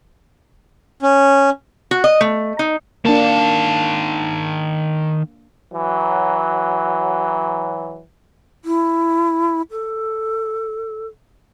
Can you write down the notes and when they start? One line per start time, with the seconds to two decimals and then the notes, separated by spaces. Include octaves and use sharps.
1.03 C#4
1.91 F#4
2.04 D#5
2.21 A3
2.59 D#4
3.05 D#3 A#3 D4 A5
5.73 E3 F#3
8.65 E4
9.71 A4